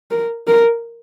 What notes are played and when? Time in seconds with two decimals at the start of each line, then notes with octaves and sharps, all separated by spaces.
0.11 A#4
0.47 A#4